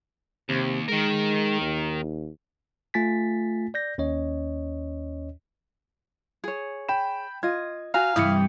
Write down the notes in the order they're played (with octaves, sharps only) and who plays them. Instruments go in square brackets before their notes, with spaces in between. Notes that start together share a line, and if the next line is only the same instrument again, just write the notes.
[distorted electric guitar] D#2 [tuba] C3
[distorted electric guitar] D#3 A#4 [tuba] G#3
[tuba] D#2
[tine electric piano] A3 F4 G#5 A6 B6
D5 G6 A#6
D#2 C#4 C#5 D#5
[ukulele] G#4 C#5
[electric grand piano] G5 B5 E7
[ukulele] F4 D#5 [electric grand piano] G#6
[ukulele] F#4 G#5 A#5 [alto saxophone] F5
[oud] G2 C3 E3 [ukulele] E4 [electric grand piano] D#6 C#7